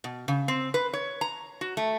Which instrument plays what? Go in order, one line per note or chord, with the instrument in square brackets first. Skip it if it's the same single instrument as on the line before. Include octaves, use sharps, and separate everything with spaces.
[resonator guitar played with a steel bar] B2
C#3
C4
B4
C#5
A#5
F#4
A3